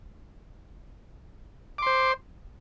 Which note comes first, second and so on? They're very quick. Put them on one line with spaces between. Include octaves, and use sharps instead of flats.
D6 C6 C5